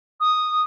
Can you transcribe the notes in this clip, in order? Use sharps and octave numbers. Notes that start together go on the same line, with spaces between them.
D#6